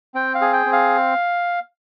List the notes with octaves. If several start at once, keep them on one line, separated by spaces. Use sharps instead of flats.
C4 G5
F5
G#4
G5
C4
F5